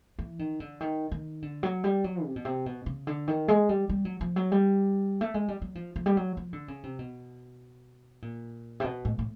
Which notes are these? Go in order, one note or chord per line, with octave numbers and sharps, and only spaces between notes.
E3
D#3
D3
D#3
D#3
D3
F#3
G3
F#3
C3
B2
C3
B2
C#3
D3
D#3
G#3
G3
G3
F#3
F3
F#3
G3
A3
G#3
G3
F#3
F3
F3
G3
F#3
F3
D3
C#3
C3
B2
A#2
C3
B2
A2
A2